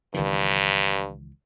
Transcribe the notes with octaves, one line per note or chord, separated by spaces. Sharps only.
C#2 G2 D#3 E3